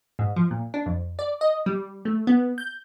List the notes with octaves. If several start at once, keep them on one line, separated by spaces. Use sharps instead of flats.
G#2
F3
A#2
D4
F2
D5
D#5
G3
A3
B3
G6